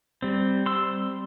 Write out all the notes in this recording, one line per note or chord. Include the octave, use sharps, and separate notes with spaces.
G3 C4
C6 E6